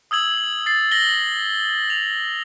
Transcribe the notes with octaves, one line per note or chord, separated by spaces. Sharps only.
D#6 E6 G#6 F#7
A6 C7
A#6 F#7 G7
F7